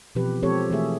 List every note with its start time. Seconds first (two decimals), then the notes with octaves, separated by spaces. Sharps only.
0.15 B2 E3 F3 C4 G4 B4
0.43 F3 G#3 C4 G4 A4 C#5
0.70 E3 A3 G#4 E5